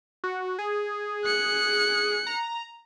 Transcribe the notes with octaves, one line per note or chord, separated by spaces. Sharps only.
F#4
G#4
F#6 C#7
A#5